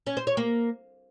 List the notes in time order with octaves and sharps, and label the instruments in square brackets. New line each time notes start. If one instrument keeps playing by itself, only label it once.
[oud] C#4
C5
C#5
A#3